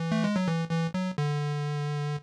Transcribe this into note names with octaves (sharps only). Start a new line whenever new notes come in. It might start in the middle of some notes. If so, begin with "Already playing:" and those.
Already playing: E3
A3
G#3
F#3
E3
E3
F#3
D3